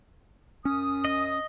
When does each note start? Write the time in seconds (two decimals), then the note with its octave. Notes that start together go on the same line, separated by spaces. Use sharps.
0.65 F#2 C#4 D#6
1.05 D#5